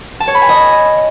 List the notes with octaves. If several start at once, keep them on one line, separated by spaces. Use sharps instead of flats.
A5
C#5
B5
G#5
D#5